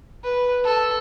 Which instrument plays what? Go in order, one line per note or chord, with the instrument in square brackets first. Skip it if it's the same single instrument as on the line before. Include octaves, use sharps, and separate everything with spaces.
[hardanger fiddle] B4
A4